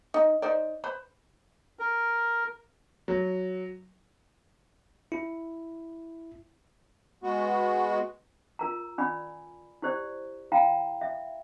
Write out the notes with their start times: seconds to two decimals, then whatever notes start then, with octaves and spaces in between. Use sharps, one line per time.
0.14 D#4
0.42 D#4 C5 D5
0.84 B4 C5 B5
1.79 A#4
3.08 F#3
5.12 E4
7.23 G#3 B3 F#4
8.59 F4 A#4 A#5
8.98 C#4 D5 G#5 B5
9.82 E4 G4 C5 D5
10.52 E4 F5 G5 A#5 B5
11.01 E5